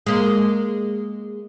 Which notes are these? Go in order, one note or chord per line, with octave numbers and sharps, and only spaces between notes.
G#3 A#3